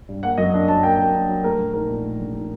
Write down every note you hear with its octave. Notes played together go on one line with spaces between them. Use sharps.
G2
A#3 F#5
F#2 D#5
D4
F#3 A5
A#3 G5
F#2
D4
F#3
A3 A#4
A#1
D#4 A#4
A#2
A3
A#1
D#4